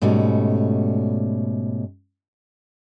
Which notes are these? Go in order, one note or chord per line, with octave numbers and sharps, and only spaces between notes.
G#2 B2 G3 A3 C#4